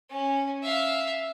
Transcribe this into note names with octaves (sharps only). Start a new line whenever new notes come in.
C#4
E5 F5